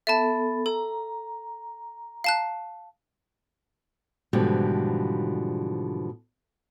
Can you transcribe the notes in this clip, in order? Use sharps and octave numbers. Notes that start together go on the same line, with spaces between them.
B3 A4 E5 A5
A4 A#5
F5 A5 F#6
G#2 B2 D3 E3 F3 G3